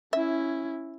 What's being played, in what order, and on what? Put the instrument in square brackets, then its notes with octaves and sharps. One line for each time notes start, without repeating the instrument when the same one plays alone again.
[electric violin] C#4 E4 [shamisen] E5